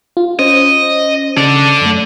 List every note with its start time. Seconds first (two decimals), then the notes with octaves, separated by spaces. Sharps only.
0.17 F4
0.39 C#4 C5 D#5
1.37 C#3 A4 D5
1.81 F#2 A3